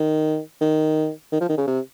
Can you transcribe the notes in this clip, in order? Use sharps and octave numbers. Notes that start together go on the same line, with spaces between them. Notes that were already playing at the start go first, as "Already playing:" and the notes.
Already playing: D#3
D#3
D#3
F3
D#3
C#3
C3